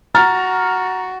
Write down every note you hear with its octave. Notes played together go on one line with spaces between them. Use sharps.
F#4 A#5 F6 A6